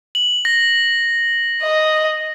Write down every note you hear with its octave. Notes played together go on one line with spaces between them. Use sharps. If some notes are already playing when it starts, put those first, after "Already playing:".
F#7
A#6
D#5